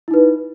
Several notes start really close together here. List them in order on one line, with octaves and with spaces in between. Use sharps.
E4 D#4 B4